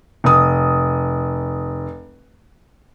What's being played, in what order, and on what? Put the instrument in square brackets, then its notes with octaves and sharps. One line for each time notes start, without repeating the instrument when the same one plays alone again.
[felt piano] F1 D#6